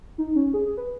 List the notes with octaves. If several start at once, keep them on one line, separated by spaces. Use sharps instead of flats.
D#4
C#4
G#4
G#4
B4